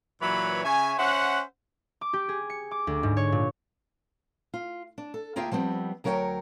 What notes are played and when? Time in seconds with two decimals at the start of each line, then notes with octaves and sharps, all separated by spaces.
0.21 A#2 E3 F#3 B4 C#5 B5
0.64 C#3 C#5 E5 G#5
0.98 C#4 C5 E5 F#5
2.01 D6
2.13 G4
2.29 G#4
2.50 C#7
2.71 D6
2.87 D2
3.03 G#2
3.17 C#5
3.32 A#2
4.54 F4
4.98 D4
5.14 A4
5.36 D2 A#3 F4 G#4 E5 G5
5.51 F3 G3 B3 C4
6.04 D2 F#3 A#4 C#5 E5 G5